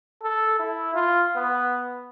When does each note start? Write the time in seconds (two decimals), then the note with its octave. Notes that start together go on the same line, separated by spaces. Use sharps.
0.23 A4
0.59 E4
0.94 F4
1.36 B3